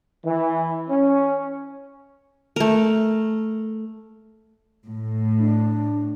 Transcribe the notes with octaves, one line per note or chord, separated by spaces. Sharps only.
E3
C#4
A3 A#4
A2
D4